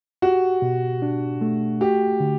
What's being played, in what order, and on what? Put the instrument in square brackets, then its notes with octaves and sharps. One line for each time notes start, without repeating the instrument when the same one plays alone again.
[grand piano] F#4 [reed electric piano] G4
[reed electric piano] B2
D4
A3
[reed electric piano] F#4 [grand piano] G4
[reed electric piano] D3